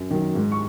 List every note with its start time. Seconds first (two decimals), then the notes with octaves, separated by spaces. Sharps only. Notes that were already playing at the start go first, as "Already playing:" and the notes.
Already playing: F#2
0.11 D#3 F#3
0.35 G#2
0.52 C#6